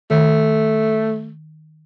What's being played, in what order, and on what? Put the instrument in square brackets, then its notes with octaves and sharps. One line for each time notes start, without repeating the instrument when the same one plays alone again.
[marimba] D#3 [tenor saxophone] A3